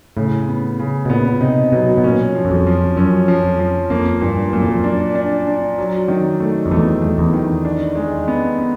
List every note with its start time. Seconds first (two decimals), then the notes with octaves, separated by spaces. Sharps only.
0.17 A2 C#3
0.48 B3
0.80 C#3
1.05 B2
1.10 A#2 B3
1.41 C3 D#4
1.72 B2 F#3
1.97 B2
2.04 A#2 C#4
2.35 F3
2.45 F#2
2.51 F2
2.67 F3
2.97 F#2 C#4
3.28 F3
3.44 F2
3.59 F3
3.90 F2 A#3
4.21 G2 A#2
4.53 F#2 A#2
4.62 F2
4.72 F#2
4.84 D4
5.15 D4
5.47 D4
5.78 F#3
6.08 D#3
6.40 A3
6.66 F2
6.71 E2 A3
7.02 A3
7.18 E2
7.33 D#3
7.65 D4
7.95 G#3
8.28 B3
8.59 B3